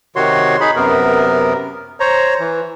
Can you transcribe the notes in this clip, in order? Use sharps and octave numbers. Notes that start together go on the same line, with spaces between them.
C3 D#3 F#4 C#5 C6
D#4 G#4 B5
F#2 C3 B3 A#4
C5 C#5 A#5
E3